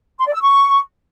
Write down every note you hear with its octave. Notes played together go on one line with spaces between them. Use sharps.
C6
D5
E6
C#6